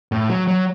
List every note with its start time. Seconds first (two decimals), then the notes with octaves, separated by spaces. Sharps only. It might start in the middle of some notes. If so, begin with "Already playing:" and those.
0.12 A2
0.30 F#3
0.48 F#3